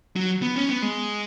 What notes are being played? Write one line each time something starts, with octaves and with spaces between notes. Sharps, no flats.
F#3
B3
C#4
B3
G#3